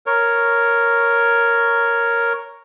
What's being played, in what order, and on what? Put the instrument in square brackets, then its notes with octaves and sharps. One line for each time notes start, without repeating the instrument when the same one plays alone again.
[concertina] A#4 C#5